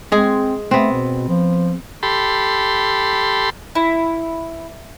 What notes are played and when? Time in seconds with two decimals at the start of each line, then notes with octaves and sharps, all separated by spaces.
0.12 G#3 C4 G#4
0.71 A3 B3 C4
0.92 B2
1.29 F3
2.03 G4 A4 B5 C6
3.75 E4